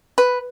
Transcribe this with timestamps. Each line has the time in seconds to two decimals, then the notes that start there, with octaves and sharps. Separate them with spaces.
0.18 B4